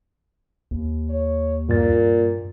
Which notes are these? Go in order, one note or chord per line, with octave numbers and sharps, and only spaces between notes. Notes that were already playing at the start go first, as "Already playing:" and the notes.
D#2
C#5
G2 A#2 A6